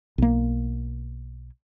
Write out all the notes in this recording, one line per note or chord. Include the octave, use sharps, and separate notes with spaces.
B1 A#3